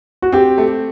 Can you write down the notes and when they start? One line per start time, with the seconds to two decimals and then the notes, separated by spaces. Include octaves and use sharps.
0.22 F#4
0.33 C4 G4
0.58 A3